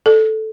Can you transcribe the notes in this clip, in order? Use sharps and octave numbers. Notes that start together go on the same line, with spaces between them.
A4